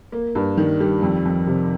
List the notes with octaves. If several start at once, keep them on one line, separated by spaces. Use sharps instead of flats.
A#3
G2
D#3
G3
F2
F2
C3